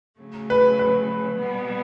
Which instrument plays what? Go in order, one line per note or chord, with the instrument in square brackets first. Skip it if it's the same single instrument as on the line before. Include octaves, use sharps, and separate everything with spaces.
[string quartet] C#3 F#3 A3
[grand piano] B4
B4
[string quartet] B2 G3 B3